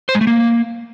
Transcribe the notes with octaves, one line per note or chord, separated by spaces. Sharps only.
C5
G#3
A3
A#3